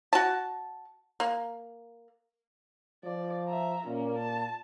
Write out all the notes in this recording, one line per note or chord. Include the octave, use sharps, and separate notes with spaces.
F#4 A5
A#3
F3 D5
E5 A#5
A#2 A#3 C#4
A5